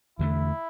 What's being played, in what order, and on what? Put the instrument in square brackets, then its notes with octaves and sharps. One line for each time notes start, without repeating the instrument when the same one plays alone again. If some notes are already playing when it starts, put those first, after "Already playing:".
[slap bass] E2 D3 A3 [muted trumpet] E4